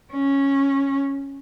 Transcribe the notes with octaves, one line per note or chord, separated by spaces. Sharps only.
C#4